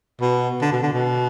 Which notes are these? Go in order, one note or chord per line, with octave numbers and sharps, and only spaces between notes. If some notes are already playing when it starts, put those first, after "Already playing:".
B2
D3
B2
D3
B2